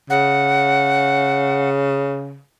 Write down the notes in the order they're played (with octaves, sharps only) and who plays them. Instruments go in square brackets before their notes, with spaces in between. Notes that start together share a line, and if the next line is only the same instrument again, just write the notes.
[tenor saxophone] C#3 [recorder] F#5